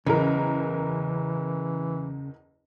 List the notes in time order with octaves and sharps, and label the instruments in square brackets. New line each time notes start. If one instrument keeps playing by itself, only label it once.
[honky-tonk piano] F#1 E2 A#4 [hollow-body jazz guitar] C#3 [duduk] E3